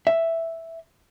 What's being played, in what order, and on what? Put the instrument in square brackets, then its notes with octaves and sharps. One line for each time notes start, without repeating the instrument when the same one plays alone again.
[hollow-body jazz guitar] E5